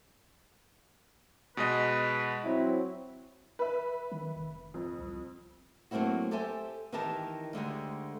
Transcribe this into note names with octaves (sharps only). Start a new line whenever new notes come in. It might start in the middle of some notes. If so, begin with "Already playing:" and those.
B2 G#3 B4 D#5
F#3 C4 E4
B4 E5
D#3
F1
F2
C2
F#3 A3 A#3 C4 E4 F#4
G4 A4 C5 E5 G#5
D#3 E3 D#4 G4 A#4 A5
D2 D3 G#3 G4